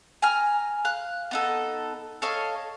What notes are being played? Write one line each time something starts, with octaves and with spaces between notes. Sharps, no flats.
G#5 A#5 F6
F5 F#6
B3 D#4 A4
A4 C#5 D#5 F5